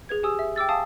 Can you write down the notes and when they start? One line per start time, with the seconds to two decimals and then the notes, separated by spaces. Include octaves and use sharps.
0.09 G#4 B4 G#6
0.23 G4 G#5 D#6 E6
0.39 E5
0.56 G5 D6 E6 A6
0.69 F5 G#5 A5 D#6